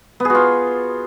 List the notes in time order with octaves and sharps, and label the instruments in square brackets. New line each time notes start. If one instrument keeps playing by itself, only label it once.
[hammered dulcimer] B3
G#4
F#4
F4